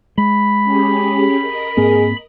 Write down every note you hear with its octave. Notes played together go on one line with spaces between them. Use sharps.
G#3 B5
C#4 G4 G#4
A#4 D#5
G#2 A#3 C4 G#4